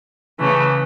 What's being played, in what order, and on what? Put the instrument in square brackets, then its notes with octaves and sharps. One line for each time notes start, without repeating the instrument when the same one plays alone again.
[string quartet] C#3 E3 A3